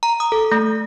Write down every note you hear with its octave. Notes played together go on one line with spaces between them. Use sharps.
A#5
D#6
A4
A3